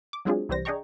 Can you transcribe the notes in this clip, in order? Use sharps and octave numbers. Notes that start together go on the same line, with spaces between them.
D6
F#3 G#3 C4 D4 F4 G#4
C2 E3 G3 C5 A#6
D4 G#4 D#5 G5 A#5 C#6